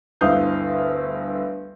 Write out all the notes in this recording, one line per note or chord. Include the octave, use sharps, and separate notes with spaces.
G1 D2 E4 F5 D#6 G6